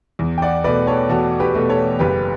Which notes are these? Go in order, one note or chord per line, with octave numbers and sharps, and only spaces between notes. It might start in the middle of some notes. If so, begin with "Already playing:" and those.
E2
G5
D5 F#5
B2 A3 B4 D5
A4 C#5
E2 F#4 A4
G4 B4
B2 A3
A4 C#5
F#1 G4 B4